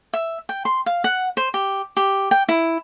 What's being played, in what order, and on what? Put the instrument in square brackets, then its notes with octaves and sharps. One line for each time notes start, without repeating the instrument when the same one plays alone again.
[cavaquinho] E5
G5
C6
F5
F#5
C5
G4
G4
G5
E4